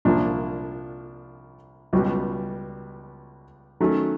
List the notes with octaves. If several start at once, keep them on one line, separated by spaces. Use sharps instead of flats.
C2 A#2 F3 A#3 D4
C#2 B2 G3
D#3 F#3 A3 C#4